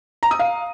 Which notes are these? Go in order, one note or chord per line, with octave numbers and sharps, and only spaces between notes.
A#5
D#6
F5